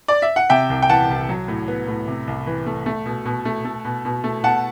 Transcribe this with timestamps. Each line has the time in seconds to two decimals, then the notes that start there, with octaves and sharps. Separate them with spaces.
0.08 D5
0.22 E5
0.36 F#5
0.50 C3 E5 G5
0.70 C2
0.82 G5
0.89 E3 F#5 A5
1.10 C2
1.29 F#3
1.48 A2
1.68 B3
1.88 A2
2.08 C3
2.27 C2
2.47 E3
2.66 A3
2.86 A3
3.06 B2
3.25 B2
3.45 A3
3.65 A3
3.85 B2
4.05 B2
4.24 A3
4.43 B2 F#5 A5